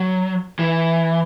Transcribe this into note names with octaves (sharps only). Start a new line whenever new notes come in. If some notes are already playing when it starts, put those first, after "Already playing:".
Already playing: F#3
E3